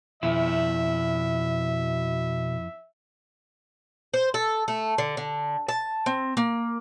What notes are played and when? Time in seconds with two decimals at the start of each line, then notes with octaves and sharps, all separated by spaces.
0.23 F2 B2 E4 E5
4.14 C5
4.34 A4
4.68 A3
4.98 D3
5.17 D3
5.68 A5
6.06 C4
6.37 A#3